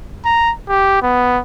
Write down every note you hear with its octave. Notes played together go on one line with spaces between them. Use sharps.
A#5
G4
B3